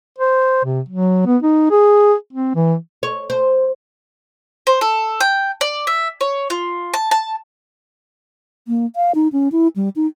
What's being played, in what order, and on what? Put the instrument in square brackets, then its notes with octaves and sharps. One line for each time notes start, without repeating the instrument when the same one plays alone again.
[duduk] C5
C3
F#3
B3
D#4
G#4
C4
E3
[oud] C#5
C5
[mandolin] C5
A4
G5
D5
E5
C#5
F4
A5
A5
[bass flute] A#3
F5
D#4
C#4
E4
G3
D#4